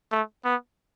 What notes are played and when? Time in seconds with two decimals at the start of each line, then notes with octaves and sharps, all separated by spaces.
0.11 A3
0.45 B3